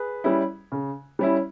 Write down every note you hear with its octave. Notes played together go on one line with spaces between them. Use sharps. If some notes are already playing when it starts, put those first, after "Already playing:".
Already playing: G#4 B4
G3 C#4 E4
C#3
G3 C#4 E4